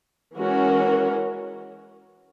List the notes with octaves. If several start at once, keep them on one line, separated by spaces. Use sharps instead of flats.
E3 G#3 C#4 F#4 A#4